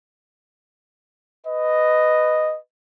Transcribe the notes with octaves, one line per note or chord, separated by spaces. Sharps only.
B4 D#5